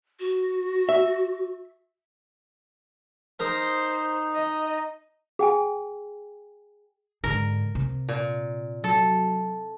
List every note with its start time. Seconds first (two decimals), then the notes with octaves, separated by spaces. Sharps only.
0.20 F#4
0.89 E5
3.40 D#4 A#4 C5 A#5 D#6
4.35 D#5
5.39 G#4 G5 G#5
7.24 G#2 D3 A#4
7.75 C3
8.09 A#2
8.84 F#3 A4